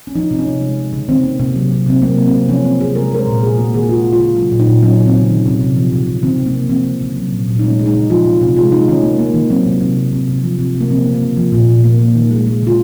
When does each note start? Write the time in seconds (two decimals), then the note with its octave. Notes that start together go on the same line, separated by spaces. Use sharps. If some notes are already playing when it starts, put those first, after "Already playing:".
0.07 C#4
0.15 F3 D#4
0.31 C3
0.39 C#4
0.47 C3
0.61 G#3
0.77 G#3
0.93 C#3
1.09 D#3 C4
1.24 A#3
1.39 C3
1.56 F#3
1.71 C3
1.86 C3 C4
2.02 F#3 A#3
2.18 C3
2.26 C4
2.33 C3
2.49 F3 C#4
2.65 C3 C4
2.81 C3 G#4
2.95 G#3 A#4
3.11 G#3 A#4
3.19 C5
3.27 A#2
3.42 A#3 G#4
3.58 A#3 F#4
3.74 D#3 G#4
3.83 F#4
3.89 G#3 F4
4.04 G#3
4.12 F4
4.20 C#3
4.36 F#3 F4
4.52 A#2
4.60 D#4
4.67 A#2
4.83 F#3 C#4
4.98 C#3
5.06 C4
5.14 C#3
5.30 D#3
5.45 C3
5.61 C3
5.77 F3
5.92 C#3
6.07 C#3
6.23 D#3 C4
6.39 C3
6.46 A#3
6.53 C3
6.69 F3 C4
6.85 C#3
7.01 C#3
7.16 F#3
7.32 A#2
7.48 A#2
7.59 D#4
7.63 G#3 C#4
7.79 G#3
7.86 D#4
7.94 C#3
8.10 F3 F4
8.26 C3
8.41 C3
8.56 G#3 F4
8.72 G#3 D#4
8.88 D#3 C#4
9.03 A#3
9.19 A#3
9.34 D#3
9.50 F#3 C4
9.66 C3
9.81 C3
9.97 F#3
10.13 C3
10.28 C3
10.44 F3
10.59 C3
10.75 C3
10.81 A#3
10.90 F3 C4
11.06 C#3
11.14 A#3
11.21 C#3
11.37 F3
11.52 A#2
11.68 A#2
11.84 A#3
11.99 A#3
12.16 D#3
12.31 G#3
12.47 G#3
12.62 C#3 F4